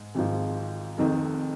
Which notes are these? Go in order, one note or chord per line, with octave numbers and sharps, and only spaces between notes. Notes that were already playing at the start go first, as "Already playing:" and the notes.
Already playing: G#2
G#1 G#2 F3
F1 F2 D#3